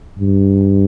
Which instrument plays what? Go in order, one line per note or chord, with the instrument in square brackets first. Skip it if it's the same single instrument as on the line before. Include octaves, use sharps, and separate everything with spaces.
[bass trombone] G2